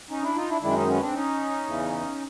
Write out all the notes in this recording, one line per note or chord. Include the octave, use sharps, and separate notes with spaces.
C#4 D#4
D4 E4
D#4 F4
D4 E4
F#2 D#3 G#3 D4 E4
C#4 D#4
B3 C#4
C4 D4
C#4 D#4
E2 C#3 E3